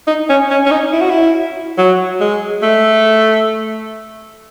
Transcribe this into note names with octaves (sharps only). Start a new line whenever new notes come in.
D#4
C#4
C#4
C#4
D#4
E4
F#4
E4
F#3
G#3
A3